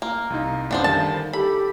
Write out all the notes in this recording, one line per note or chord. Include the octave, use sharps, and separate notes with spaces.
A#3
C2 D#4 F5
F#2 B3 D4 C5
D3 D#3 G3 A5
G4 A4 B5